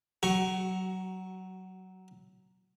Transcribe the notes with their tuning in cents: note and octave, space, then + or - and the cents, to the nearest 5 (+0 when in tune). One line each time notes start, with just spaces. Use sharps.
F#3 +15 F#4 +35 C#6 +0